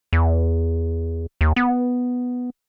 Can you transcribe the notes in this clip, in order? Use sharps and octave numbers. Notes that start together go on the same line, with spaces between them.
E2
D#2
B3